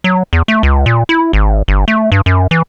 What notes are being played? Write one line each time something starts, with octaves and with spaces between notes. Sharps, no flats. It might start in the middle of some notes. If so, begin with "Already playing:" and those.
F#3
E2
A3
C#2
A#2
E4
G#1
G1
A3
G2
F#2
E3